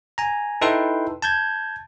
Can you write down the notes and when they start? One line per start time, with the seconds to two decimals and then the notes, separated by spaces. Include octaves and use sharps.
0.18 G#5 A#5
0.61 D#4 E4 A4 B4 G5 C6
1.22 A5 G6 G#6